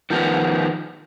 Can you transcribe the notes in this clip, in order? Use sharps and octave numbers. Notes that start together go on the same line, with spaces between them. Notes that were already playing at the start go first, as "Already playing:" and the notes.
D#3 F3 B3